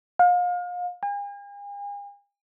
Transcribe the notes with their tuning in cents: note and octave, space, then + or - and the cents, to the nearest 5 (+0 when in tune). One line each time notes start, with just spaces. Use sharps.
F5 +35
G#5 -45